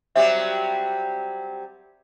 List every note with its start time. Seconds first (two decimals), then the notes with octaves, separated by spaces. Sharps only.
0.15 F#3 G3 C4 E5